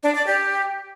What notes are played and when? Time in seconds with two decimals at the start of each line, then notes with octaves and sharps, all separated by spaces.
0.03 D4
0.15 D5
0.27 G4